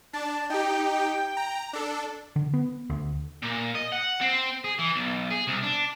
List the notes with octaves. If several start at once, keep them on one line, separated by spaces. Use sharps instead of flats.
D4 A5
D#4 G4 G5
A#5
D4 A4
D3
B3
D2
A#2
D#5
F#5
C4
G#4
E3
B1
G#4
C2
D4